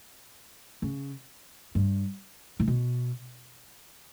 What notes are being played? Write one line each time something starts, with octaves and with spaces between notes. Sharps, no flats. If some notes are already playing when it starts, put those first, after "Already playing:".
C#3
G2
A2
B2